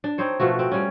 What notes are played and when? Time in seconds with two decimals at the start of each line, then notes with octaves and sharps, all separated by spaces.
0.04 D4
0.18 C4 D#4 C5 C#5
0.40 B2 F3 A3 F#4
0.59 C4
0.72 G3 C#4